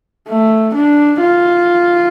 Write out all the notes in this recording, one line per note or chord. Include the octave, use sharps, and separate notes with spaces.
A3
D4
F4